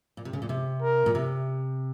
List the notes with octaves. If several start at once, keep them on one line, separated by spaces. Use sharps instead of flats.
A#2
C3
C#3
A#2
C3
A#4
A#2
C3